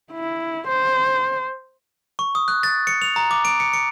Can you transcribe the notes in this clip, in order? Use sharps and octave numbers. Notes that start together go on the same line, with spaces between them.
E4
C5
C#6
D#6
F#6
A6
C#7
F7
A#5
D6
D7
C#7
C#7